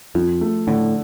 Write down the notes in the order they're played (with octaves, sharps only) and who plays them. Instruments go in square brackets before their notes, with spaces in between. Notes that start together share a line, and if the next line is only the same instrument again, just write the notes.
[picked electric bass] F2 [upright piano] F3
[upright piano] A3
[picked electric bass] A2 [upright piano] D3